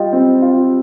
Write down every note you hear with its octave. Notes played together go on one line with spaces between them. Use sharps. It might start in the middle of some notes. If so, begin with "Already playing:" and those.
Already playing: G3 F4 D#5 G5
C4
F4